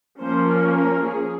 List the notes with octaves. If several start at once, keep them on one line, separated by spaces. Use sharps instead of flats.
F3 A#3 C#4 C5
A#4
A#4
G#4